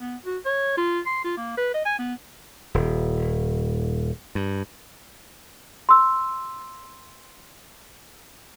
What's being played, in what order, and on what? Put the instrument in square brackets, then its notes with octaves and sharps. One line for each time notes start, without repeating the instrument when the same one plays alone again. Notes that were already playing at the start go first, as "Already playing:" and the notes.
[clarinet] B3
F#4
C#5
F4
C6
F4
A#3
B4
D#5
G#5
B3
[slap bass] D#1
G2
[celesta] C6 E6